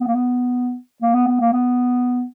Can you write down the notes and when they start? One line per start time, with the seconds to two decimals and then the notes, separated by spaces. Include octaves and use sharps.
0.01 B3
0.07 A#3
0.15 B3
1.02 A#3
1.14 B3
1.28 B3
1.40 A#3
1.53 B3